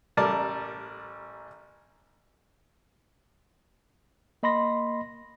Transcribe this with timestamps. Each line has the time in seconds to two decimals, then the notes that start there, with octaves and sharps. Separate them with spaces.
0.17 A1 G3 A#4 D5 A5
4.43 A#3 D#5 B5 C6 A#6